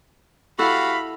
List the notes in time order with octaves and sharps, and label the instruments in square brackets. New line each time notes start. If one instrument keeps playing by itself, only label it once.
[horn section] G3 F#4 F5 [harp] E4 A4 F#5 [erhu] B5